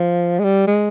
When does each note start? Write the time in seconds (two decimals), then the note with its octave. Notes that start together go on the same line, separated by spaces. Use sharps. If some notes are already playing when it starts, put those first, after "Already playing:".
Already playing: F3
0.39 G#3
0.44 G3
0.67 G#3